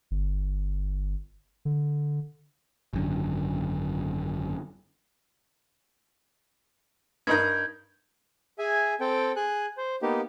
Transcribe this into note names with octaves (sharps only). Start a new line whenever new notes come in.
G1
D3
G#1 F#2 D3
G2 D#4 A#4 G6 G#6
G#4 E5 G#5
C4 A4 G5
G#4 G#5 F#6
C5
A#3 B3 D#4 G4